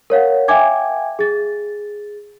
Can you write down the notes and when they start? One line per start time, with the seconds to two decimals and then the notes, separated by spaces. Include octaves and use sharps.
0.10 A#4 C#5 F5 F#5
0.48 E5 F5 G5 G#5 D6 G#6
1.19 G#4 A6